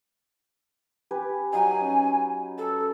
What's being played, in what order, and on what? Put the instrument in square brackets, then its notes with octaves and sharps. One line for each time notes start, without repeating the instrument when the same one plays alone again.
[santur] G4 B4 G#5
[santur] F#3 D#4 [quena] G#5
[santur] C#4
[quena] A4 [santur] B5